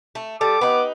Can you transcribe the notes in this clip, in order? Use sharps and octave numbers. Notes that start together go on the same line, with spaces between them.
A3
G3 A4 D6
B3 D#4 B4